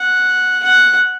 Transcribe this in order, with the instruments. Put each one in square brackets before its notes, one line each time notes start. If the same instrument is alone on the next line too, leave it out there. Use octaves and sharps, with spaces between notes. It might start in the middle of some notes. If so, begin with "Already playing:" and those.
Already playing: [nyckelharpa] F#5
F#5